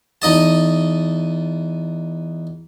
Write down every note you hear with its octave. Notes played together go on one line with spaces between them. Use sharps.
E2 D#4 D#5 A5